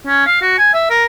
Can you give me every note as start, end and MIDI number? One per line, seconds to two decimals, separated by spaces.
0.07 0.23 61
0.27 0.40 77
0.41 0.53 66
0.58 0.71 80
0.73 0.87 76
0.90 1.05 70